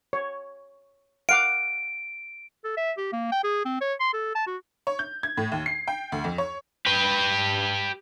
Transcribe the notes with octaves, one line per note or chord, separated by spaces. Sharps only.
C#5
F5 F#5 D6 D7
A4
E5
G4
A#3
G5
G#4
C4
C#5
C6
A4
A5
F#4
C#5
G6
G#6
A2
D#2
C7
G5
D2
F2
C#5
G4 B4